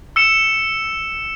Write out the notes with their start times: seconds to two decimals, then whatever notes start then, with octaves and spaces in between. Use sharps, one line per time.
0.16 E6 C#7 E7